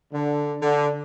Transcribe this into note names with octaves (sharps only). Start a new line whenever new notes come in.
D3
D3